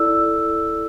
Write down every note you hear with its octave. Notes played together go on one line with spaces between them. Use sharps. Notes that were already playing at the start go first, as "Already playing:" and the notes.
Already playing: E4 A4 D5 E6